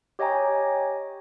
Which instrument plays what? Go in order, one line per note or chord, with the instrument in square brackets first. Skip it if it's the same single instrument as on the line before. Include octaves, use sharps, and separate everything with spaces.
[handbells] G4 C#5 D#5 G5 G#5 A#5